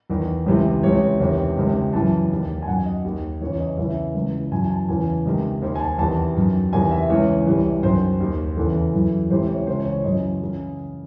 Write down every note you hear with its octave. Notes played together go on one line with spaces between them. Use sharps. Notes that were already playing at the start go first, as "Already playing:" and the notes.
E2 D#3
C#2 C3 E3
C#2 C3 E3 C#5
E2 C3 D#3
C#2 C3 D#3
F#2 C#3 E3 A5
D#2 D#3
G#5
F#2 D#3 F#5
D#5
D#2 D#3
E2 C#3 E3 C#5
D#5
E2 C#3 E3 E5
C#2 C#3 E3
F#2 E3 G#5
G#5
A5
E2 C#3 E3 G#5
C#2 C3 D#3
D#2 D#3 C5
G#5
A5
E2 C3 D#3 A5
F#2 D#3
E2 C3 D#3 G#5
E5
C#2 C#3 E3 C#5
C2 C3 E3
F#2 D#3 C5
D#2 D#3
E2 C#3 E3 A4
F#2 E3
C#2 C3 E3 C5
C#5
C#2 C#3 E3 C5
C#5
C#5
F#2 C#3 E3 D#5
C#3 E3